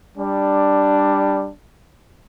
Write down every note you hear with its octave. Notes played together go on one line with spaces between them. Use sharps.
G3 D4